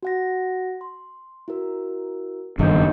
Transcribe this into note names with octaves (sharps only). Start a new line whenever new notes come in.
F#4 F#5 A#6
C6
E4 F#4 A#4
F#1 G2 D#3 D#4 D#5 G6